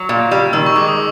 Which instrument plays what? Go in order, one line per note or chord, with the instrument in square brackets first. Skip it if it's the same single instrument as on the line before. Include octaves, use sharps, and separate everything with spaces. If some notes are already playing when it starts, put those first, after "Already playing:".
Already playing: [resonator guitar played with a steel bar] F#3
A#2
G3
[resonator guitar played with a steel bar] D#3 [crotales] E6
[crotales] C#6
[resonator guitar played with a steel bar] G#3 [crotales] D6
[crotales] D#6